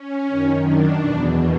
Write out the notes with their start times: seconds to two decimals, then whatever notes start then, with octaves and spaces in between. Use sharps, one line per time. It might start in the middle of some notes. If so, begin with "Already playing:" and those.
Already playing: C#4
0.28 F#2 D#3
0.64 D4
0.99 E2 B2